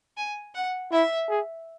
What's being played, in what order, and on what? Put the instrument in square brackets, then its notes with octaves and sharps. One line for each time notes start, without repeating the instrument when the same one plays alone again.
[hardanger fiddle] G#5
F#5
[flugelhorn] E4 [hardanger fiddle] E5
[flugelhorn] G#4